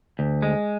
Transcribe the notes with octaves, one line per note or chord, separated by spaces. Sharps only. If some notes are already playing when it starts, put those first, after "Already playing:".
D2
G#3